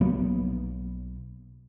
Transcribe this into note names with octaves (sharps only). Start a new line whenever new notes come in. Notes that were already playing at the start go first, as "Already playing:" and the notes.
B1 F#3 A#3 B3